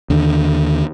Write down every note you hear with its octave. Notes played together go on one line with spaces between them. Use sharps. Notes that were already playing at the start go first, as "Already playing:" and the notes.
D#2 D3